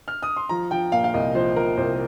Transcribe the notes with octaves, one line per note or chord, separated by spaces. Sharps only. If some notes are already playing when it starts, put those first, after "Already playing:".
F6
D#6
C6
F3 A#5
F3 G5
A#2 F5
F5
C2 D#5
F3 C5
F3 A#4
C2 C5